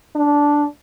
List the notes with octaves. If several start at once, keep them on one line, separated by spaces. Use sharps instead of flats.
D4